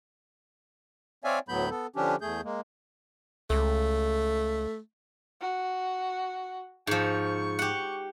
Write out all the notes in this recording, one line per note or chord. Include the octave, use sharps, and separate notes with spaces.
C4 C#5 D5 E5 F5 G#5
D2 A2 F#3 B3 B5 G6
B3 A4
D3 F3 C#4 D4 G4
E2 A3 G#4 G6
G#3 A#3
C#2 A3
F#4
G#2 F3 C#6
G4 F#5